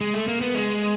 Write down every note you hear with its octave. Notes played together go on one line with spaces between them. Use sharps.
G#3
A3
A#3
B3
G#3